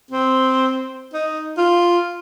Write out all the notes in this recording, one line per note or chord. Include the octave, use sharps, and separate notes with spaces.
C4
D#4
F4